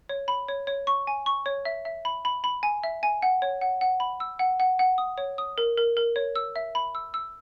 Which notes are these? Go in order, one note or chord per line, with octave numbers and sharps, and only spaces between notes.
C#5
B5
C#5
C#5
C#6
G#5
C#6
C#5
E5
E5
B5
B5
B5
G#5
E5
G#5
F#5
C#5
F#5
F#5
B5
E6
F#5
F#5
F#5
D#6
C#5
D#6
A#4
A#4
A#4
C#5
E6
E5
B5
E6
E6